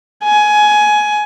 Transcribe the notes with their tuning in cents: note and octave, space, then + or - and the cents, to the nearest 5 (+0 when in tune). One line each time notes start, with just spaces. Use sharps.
G#5 +15